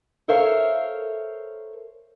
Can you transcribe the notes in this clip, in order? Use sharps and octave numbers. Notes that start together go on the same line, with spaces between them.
A4 A#4 C5 C#5 E5 F5